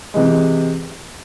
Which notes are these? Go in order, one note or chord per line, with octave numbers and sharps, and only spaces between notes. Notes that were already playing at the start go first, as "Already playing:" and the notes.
C3 E3 G#3